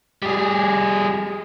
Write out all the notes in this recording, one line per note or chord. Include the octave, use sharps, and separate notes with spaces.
G3 G#4